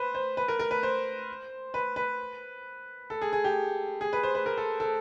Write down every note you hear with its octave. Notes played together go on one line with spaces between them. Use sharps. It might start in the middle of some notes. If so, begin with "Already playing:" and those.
Already playing: B4 C5
C5
B4
A#4
A#4
B4
C5
B4
B4
A4
G#4
G#4
G4
G#4
B4
C5
B4
A#4
A4
A4